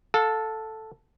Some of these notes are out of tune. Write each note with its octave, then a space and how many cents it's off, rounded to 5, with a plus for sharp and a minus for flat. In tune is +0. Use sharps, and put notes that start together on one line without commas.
A4 +0 F5 +40